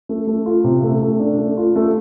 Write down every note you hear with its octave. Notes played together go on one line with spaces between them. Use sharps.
A3
A3
F4
C3
A3
A3
D4
A3
F4
A3